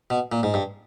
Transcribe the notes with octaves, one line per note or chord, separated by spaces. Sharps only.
B2
A#2
G#2
G2